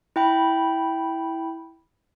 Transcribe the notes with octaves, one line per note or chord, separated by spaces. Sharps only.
E4 G5 B5